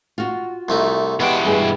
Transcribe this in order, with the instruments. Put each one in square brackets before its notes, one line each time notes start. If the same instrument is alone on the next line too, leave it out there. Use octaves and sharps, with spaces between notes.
[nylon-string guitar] F4 F#4
[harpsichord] C2 A3 D#4
[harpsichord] B2 G3 G#3 [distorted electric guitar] E3 G5
[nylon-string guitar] G2 G#4